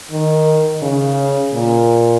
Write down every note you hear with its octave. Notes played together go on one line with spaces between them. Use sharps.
D#3
C#3
A#2